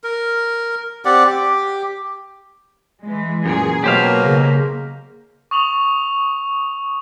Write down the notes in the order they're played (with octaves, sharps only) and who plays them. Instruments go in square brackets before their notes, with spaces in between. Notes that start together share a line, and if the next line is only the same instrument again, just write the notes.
[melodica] A#4
C4 G4 D5 F#5
G4
[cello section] E3 G#3
[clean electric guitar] F#2 A#2 [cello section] G#4
[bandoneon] B2 F#3 [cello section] A#3 [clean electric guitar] G4 C5 F5
[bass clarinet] C#3
[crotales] C#6 D#6 F7 F#7